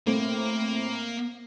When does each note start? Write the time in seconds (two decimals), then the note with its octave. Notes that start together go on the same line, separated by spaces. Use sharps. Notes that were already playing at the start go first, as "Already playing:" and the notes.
0.07 A2 A3 A#3 C4